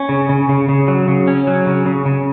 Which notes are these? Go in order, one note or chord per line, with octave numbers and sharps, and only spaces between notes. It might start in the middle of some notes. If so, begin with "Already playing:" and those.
Already playing: C#4
C#3
C#3
C#3
C#3
F#3
C#3
C#4
F#3
C#3
C#3
C#3